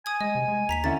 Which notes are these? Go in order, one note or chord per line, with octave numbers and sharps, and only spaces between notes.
G#5 D#6 G#6
G#3 D#5
C3
G#3
D#2 A#5 B6 F7
D3 C#4 E4 A6